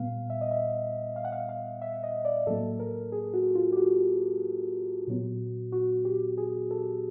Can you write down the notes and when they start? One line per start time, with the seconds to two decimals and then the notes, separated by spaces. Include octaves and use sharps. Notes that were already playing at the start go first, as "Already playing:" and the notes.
Already playing: A#2 G3 B3 F5
0.30 E5
0.41 D#5
0.51 E5
1.16 F5
1.25 F#5
1.32 F5
1.49 F5
1.82 E5
2.03 D#5
2.25 D5
2.46 A2 F#3 A#3 A4
2.79 A#4
3.12 G#4
3.34 F#4
3.55 F4
3.72 G4
3.77 F#4
5.07 A#2 F#3 B3
5.72 F#4
6.05 G4
6.38 G#4
6.71 A4